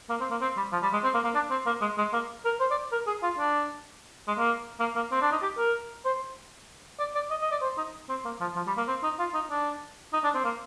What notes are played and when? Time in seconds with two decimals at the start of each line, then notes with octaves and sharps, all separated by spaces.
0.10 A#3
0.21 C4
0.31 A#3
0.41 C4
0.57 G3
0.72 F3
0.83 G3
0.93 G#3
1.04 C4
1.14 A#3
1.24 A#3
1.35 D4
1.51 C4
1.66 A#3
1.81 G#3
1.98 G#3
2.13 A#3
2.45 A#4
2.60 C5
2.71 D5
2.92 A#4
3.07 G#4
3.23 F4
3.39 D4
4.28 G#3
4.38 A#3
4.80 A#3
4.96 A#3
5.12 C4
5.22 D4
5.32 D#4
5.43 G4
5.58 A#4
6.05 C5
7.00 D5
7.15 D5
7.31 D#5
7.42 D#5
7.51 D5
7.62 C5
7.78 D#4
8.09 C4
8.25 A#3
8.40 F3
8.56 F3
8.67 G3
8.77 A#3
8.88 C4
9.03 D#4
9.19 F4
9.34 D#4
9.51 D4
10.13 D#4
10.24 D4
10.35 C4
10.44 A#3